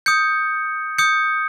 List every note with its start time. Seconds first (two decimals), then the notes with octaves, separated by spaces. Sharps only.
0.06 D#6 G6 C#7
0.98 D#6 G6 C#7